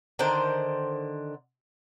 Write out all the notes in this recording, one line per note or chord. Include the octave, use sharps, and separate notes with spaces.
D3 D#3 A#4 C5